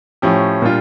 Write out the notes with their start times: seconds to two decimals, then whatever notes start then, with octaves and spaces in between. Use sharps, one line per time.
0.22 A2 F3 C#4 G4
0.62 A#2 G3 D4 F4